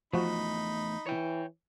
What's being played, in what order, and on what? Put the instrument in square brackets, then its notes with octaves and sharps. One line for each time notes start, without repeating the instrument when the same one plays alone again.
[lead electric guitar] E2 A3 [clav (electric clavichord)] F3 F#4 [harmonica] D#4 B5
[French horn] E3 [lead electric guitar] C#5 G5